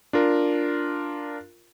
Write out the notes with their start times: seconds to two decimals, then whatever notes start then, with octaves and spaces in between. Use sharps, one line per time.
0.13 D4 F4 A#4